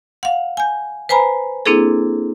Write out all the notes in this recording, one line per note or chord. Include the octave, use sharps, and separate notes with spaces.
F5 F#5
G#5 G6
B4 C5 G#5 A#5 B5
A#3 C4 D4 E4 G#4 A4